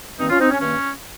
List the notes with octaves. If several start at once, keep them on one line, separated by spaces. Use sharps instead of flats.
G2 D#3 A#3 C4 D#4
C#4 F4
C4 D#4
C#4
G2 D#3 A#3 C#4